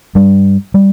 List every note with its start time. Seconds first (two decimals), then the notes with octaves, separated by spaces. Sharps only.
0.15 G2 G3
0.74 G3